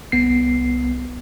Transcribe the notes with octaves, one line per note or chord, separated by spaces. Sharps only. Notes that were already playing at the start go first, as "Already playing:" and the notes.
C2 B3 C7